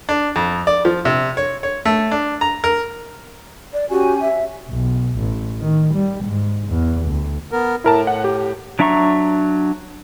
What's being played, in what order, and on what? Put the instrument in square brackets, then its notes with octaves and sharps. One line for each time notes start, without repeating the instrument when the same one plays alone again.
[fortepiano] D4
F2
D5
F3
C3
C#5
C#5
A3
D4
A#5
A#4
[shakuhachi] D5
[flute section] C#4 G4 G#5 [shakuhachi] F#4
[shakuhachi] E5
[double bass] B1
A1
D#3
G3
G#2
E2
D2
[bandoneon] B3 A#4
[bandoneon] A2 [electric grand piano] E4 A#4 A5
[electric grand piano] F#5
G4
[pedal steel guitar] F#3 D4 E5 A#5 C#6